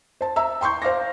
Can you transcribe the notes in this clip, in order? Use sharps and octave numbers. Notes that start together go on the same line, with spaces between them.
C5 A5
E5 A#5 E6
G5 C6 C#6 G6
C5 F5 D6 A#6